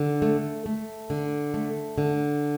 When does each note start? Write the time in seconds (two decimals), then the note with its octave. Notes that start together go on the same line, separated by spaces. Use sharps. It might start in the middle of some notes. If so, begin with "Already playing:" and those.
Already playing: D3
0.22 A3
0.66 A3
1.10 D3
1.54 A3
1.98 D3